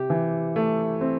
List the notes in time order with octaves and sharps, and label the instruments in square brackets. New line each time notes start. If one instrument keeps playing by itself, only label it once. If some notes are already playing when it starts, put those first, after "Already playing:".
Already playing: [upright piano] C3 [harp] G4
[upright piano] E3
A3
C4